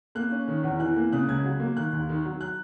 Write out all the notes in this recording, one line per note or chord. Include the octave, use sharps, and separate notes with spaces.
A#3 F#6
C#4
D#3
E2
E3 F#6
A#3
C#3 F#6
C#2 G#6
F#3
A#3
D#3 F#6
D#2
D#3
F#3
F#6